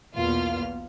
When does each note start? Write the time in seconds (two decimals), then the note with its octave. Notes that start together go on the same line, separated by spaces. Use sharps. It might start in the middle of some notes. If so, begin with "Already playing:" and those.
0.16 B1 E2 B2 A#3 F4 F6